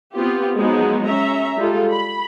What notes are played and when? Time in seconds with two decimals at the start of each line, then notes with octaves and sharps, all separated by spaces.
0.14 B3 C4 F4 G4
0.56 F3 F#3 G#3 B3 D#4 F#4
1.05 C#4 E5 A#5
1.57 G3 G#3 F4 A4
1.92 B5